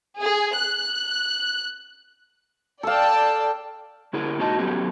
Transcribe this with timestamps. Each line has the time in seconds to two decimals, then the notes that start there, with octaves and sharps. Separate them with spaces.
0.19 G#4
0.55 F#6
2.83 A4 D5 F5 G5 A5
4.13 D3 E4 G#4 A#4
4.39 A#2 G#3 D#4 F#4 D#5 A5
4.58 F#3 A3 B3 C#4 G4 G#4